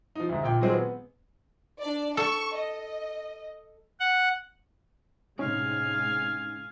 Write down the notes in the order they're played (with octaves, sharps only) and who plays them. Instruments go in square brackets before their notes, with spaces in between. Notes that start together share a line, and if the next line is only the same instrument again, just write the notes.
[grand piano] F3 D#4
D2 G#2
A#1 A#2 G5
A#2 D#3 F#3 G#3 C4 G#4
B3
[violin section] D4 D5
[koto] A4 [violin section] C#6
[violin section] D#5
[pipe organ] F#5
[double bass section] A2 C3 G#3 [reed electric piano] C#4 D#4 [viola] F5 G#5